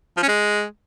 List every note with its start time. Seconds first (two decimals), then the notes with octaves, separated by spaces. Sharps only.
0.17 F3
0.23 C#4
0.28 G#3